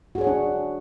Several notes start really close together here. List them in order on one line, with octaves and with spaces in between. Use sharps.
F#4 G#4 C#5 F#5 D4